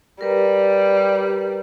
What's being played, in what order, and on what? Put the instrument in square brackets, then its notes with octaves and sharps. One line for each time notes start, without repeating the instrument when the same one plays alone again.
[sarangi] G3 [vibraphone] A#4 B4 A#5